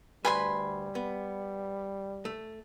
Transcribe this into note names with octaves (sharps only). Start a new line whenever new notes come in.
D2 G3 B4 G#5 B5 C6
B3
A3